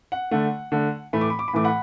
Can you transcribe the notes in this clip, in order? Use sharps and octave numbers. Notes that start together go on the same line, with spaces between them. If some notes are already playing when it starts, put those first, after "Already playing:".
F#5
D3 A3 F#5
D3 A3
A2 E3 A3 B5
D6
B5
D6
B5
A2 E3 A3 D6
F#5 B5